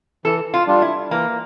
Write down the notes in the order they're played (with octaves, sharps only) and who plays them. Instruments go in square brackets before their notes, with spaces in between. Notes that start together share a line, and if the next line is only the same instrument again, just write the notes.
[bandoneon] E3 [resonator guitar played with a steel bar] A4
[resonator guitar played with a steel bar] F4
[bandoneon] G3 D4 F4
[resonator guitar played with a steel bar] E4
[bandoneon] E3 [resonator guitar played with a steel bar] A#3